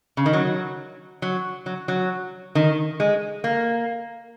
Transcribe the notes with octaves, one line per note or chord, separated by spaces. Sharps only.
C#3
D#3
F#3
F#3
F#3
F#3
D#3
G#3
A#3